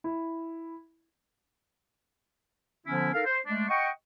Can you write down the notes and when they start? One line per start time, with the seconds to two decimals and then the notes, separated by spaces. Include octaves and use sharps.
0.04 E4
2.87 D3 F3 B3 C#4 E4
3.14 D#4 A4 A#4 F5
3.26 C5
3.46 G#3 A3 D4
3.69 D#5 F#5 G5 C#6